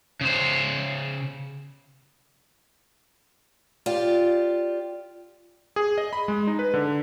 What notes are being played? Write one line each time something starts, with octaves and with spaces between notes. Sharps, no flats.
C#3 C5
F4 G4 D5
G#4
D#5
B5
G#3
D#4
B4
D3